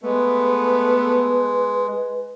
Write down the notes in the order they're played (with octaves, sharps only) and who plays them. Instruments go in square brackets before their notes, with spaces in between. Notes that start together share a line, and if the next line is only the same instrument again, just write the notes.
[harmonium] G#3 [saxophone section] A3 B3 [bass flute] B4